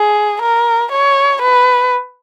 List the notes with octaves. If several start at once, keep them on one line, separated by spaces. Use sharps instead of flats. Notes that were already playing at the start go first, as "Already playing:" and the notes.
Already playing: G#4
A#4
C#5
B4